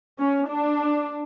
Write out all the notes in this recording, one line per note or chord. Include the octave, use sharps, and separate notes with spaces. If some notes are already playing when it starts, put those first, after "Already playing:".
C#4
D4